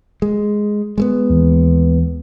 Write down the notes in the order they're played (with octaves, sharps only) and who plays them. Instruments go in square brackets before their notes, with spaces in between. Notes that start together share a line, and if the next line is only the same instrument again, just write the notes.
[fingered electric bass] G#3
G#3 A3 B3
[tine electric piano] D#2 E3